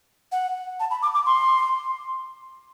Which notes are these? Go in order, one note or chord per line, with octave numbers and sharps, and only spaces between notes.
F#5
A5
B5
D6
D6
C6